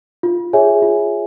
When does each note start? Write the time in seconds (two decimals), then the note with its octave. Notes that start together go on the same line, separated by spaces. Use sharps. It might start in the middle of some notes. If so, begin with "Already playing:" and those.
0.23 F4
0.53 G#4 C#5 E5 G#5
0.82 F4